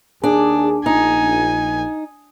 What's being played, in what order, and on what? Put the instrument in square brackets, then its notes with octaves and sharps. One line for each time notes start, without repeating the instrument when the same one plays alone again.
[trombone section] D#2 G#4 [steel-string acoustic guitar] D4
[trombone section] A#1 [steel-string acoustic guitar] D#4 [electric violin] G#5